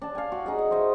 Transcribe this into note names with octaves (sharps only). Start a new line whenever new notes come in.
D4 A5
F5 G#5
F#4
D#4 G#4 D#5
D#5
C5 D#5 E5